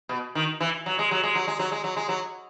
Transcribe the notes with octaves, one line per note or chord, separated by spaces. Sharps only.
B2
D#3
E3
F#3
G#3
F#3
G#3
F#3
G#3
F#3
G#3
F#3
G#3
F#3